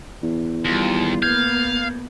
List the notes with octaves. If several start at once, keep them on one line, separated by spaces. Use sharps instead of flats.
E2
D#2 G3 F4
A#3 B3 F5 G6 G#6